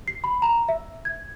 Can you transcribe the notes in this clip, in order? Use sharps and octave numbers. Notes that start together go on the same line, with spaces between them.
C7
B5
A#5
E5
G#6